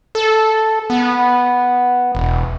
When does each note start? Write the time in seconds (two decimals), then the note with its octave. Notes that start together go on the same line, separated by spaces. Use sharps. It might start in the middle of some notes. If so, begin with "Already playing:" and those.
0.15 A4
0.90 B3
2.15 E1